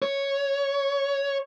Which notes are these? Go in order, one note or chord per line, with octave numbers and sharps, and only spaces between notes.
C#5